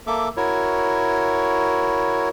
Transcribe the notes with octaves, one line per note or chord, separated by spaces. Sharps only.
A#3 A4 E5 D6
E4 F#4 A#4 C#5